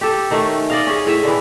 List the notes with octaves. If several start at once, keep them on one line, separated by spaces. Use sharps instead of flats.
G4 A4
D#3 A3 C#4
D5 D#5 F5
C#4 G#4
A2 G#4 C#5 E5
D3 E3